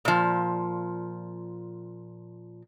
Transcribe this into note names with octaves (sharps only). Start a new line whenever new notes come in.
A#2 F3